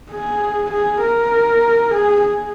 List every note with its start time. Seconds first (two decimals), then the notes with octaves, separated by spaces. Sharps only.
0.12 G#4
0.72 G#4
1.02 A#4
1.91 G#4
2.22 G#4